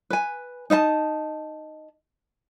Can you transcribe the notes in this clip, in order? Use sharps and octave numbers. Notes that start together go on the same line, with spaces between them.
B4 G#5
D#4 D#5 E5 A5